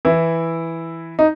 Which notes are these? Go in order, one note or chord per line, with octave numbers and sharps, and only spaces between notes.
E3 E4
D#4